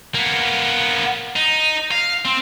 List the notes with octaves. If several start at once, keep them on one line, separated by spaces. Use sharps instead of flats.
A#3 B3
D#4
F5
C4